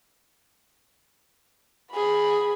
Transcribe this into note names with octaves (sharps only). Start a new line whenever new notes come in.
G#4 B5